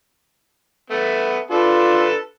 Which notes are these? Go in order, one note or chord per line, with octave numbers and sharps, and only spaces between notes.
A3 B3
D4 F4 A4 B4